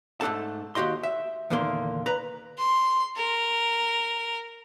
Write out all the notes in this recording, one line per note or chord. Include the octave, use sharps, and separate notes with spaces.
G#2 A3 D4 A4 A5
D#2 F#4 G4 D#5 C6
E5
E2 A#2 D3 D#3 A#3 C6
B4 A#5
C6
A#4